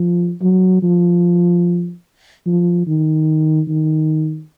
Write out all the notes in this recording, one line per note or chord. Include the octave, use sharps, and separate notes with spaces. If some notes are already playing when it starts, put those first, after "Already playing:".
Already playing: F3
F#3
F3
F3
D#3
D#3